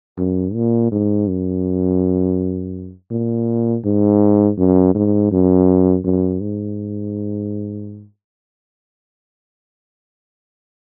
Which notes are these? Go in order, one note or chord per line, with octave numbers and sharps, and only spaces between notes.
F#2
A#2
G#2
F#2
A#2
G#2
F#2
G#2
F#2
F#2
G#2